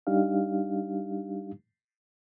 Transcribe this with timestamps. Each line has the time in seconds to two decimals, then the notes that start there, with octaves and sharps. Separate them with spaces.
0.07 G3 D4 D#4 G4 F5